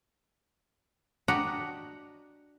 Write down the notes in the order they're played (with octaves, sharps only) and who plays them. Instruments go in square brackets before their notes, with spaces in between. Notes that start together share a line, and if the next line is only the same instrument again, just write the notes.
[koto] D4 F#4 G4 D#5 F#5 A#5